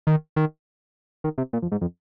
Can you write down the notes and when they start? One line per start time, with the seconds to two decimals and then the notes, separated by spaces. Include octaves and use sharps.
0.07 D#3
0.36 D#3
1.24 D#3
1.38 C3
1.53 A#2
1.62 F2
1.72 G#2
1.81 F2